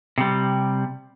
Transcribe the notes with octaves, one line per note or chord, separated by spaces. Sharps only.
C3 G3